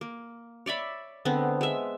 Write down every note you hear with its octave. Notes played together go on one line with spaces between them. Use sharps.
A#3
C#5 D5 E5 B5
D3 G#3 B3 C4
G#3 E5